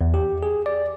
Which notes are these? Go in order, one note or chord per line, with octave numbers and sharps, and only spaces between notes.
E2
G4
G#4
D5